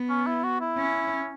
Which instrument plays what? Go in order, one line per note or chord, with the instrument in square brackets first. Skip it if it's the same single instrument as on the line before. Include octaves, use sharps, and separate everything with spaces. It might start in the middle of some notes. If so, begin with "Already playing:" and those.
Already playing: [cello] B3
[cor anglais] C#4
E4
F#4
E4
[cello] C#4